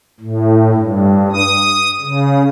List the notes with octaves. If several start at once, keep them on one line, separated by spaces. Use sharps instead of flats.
A2
G2
D#6
C#3